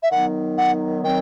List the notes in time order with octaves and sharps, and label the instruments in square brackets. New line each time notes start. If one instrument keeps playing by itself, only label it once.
[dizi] E5
[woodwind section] D#3 F#3 B3 D#4 [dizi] F#5
[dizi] F#5
[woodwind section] D#3 F#3 C4 [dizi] G5